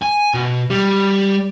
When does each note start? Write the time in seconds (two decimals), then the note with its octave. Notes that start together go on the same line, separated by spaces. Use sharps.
0.02 G#5
0.34 B2
0.70 G3